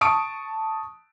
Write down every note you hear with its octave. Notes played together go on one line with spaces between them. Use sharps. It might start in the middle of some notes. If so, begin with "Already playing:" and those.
A5 C#6 D#6 D7